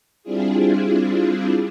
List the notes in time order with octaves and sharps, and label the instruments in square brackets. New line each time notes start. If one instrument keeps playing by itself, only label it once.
[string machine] G3 C4 D4 E4 F4 G#4